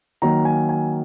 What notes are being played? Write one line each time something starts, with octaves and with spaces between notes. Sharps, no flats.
D#3 F#3 A#3 A#5
G#5
G#5